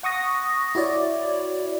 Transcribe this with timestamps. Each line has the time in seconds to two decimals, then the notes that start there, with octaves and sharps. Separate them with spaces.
0.03 F#5 C#6 D#6 A#6
0.75 E4 F#4 C#5 D5